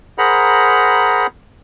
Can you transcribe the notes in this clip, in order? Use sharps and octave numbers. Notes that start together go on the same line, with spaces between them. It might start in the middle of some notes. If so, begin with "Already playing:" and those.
G#4 A#4 C5 F#5 A#5 B5